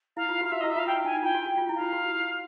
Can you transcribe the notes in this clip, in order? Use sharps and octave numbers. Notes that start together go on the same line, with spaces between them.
E4 F5
F4
F#4
F5
F#4 E5
D#5
E4
E5
F4 F5
E4 G5
D#4 G#5
F4 G5
F#4
F#4
F4
E4
F5
F4
F#4